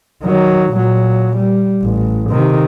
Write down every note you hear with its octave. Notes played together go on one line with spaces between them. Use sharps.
D#3 F#3
A#2 F#3
G3
A1
C3 D#3